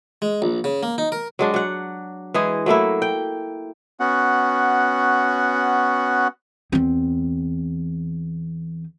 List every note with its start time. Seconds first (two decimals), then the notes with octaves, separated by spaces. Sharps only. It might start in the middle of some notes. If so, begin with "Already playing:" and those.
0.22 G#3
0.42 A#1
0.64 C#3
0.83 A#3
0.98 D#4
1.12 A#4
1.39 F#3 G#3 D4
1.54 F#3 F#5
2.34 E3 G#3 G#4
2.66 F#3 A3 A#3 E4
3.02 G5
4.00 B3 C#4 F#4 F#5
6.72 E2 C4